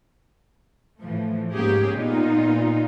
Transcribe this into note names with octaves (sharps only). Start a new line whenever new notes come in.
A2 E3 F3 A3
G#2 A#3 C#4 G4 G#4
A#2 B3 D#4 F4